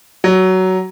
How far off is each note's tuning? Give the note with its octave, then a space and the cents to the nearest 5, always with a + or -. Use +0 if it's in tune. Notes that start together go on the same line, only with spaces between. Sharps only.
F#3 +15